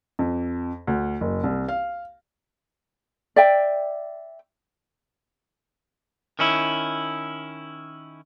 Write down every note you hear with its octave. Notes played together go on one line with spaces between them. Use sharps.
F2
D2
F#1
C2
F5
D5 E5 G5
D#3 C#4 E4